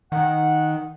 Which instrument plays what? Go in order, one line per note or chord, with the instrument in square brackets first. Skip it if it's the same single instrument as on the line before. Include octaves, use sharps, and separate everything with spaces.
[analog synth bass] D#3 [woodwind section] F#5